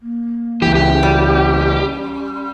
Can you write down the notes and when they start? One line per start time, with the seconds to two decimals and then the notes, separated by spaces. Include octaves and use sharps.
0.02 A#3
0.62 C#2 E3 G4
0.75 C#4 G4
1.03 G3 F#4
1.33 C#4